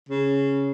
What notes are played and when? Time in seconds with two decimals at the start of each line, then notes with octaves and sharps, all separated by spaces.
0.09 C#3